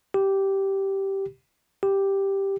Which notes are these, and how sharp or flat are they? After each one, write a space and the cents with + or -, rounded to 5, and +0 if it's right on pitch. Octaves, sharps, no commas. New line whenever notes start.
G4 -10
G4 +0